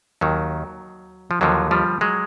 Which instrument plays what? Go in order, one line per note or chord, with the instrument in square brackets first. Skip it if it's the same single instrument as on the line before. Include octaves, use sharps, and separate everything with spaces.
[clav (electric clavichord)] D#2 D#3 F#3
F3
D#2 D3 F3 F#3
F3 G3
F#3 G#3